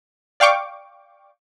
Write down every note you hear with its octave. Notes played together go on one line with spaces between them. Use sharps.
D5 F5 G5 C#6 D6